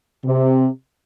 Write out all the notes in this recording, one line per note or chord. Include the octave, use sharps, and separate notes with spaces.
C3